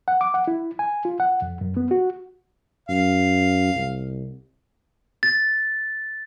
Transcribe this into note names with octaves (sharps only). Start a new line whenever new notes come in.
F#5
D6
F#5
E4
G#5
F4
F#5
F2
F#2
B3
F#4
F#2 F5
C2
A6